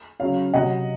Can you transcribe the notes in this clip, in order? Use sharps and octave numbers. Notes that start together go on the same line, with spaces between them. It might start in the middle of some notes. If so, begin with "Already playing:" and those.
C#3 F#3 C#5 F5
C3 F#3 D#5 F#5